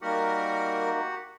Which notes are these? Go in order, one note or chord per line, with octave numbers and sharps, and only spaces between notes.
G3 A#3 D#4 F#4 G4 A#4 F#5